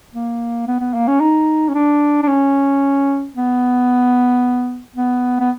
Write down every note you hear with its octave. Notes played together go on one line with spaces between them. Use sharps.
A#3
B3
B3
A#3
C#4
D#4
C#4
D4
D4
C#4
B3
B3
B3